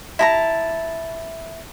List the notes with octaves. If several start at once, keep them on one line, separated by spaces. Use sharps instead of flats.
E4 A5 A#5